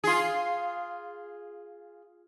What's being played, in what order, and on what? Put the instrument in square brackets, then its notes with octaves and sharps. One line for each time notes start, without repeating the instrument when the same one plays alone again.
[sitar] F4 G#4